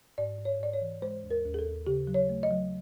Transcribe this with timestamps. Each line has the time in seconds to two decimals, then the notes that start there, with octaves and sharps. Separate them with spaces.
0.18 G#2 D5
0.38 G#2
0.45 C#5
0.59 G#2 D5
0.73 C#5
0.81 E3
1.02 G#3 C5
1.23 D#2
1.31 A#4
1.44 D#2
1.54 G#4
1.59 A4
1.66 D#2
1.87 C#3 G4
2.07 F#3
2.14 C#5
2.29 A3
2.43 D#5
2.51 F#3